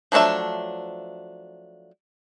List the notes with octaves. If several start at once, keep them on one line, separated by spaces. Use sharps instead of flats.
F3 F#3 A3 D4 E5